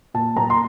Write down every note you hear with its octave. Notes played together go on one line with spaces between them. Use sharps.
A#2 A5
A#2 A#5
C6